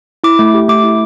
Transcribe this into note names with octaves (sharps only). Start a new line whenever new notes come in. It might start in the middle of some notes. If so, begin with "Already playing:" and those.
E4 D6
A3
G4
A3 D6
E4